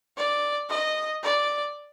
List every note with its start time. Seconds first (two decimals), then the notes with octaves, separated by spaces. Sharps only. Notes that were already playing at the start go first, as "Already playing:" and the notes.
0.17 D5
0.69 D#5
1.23 D5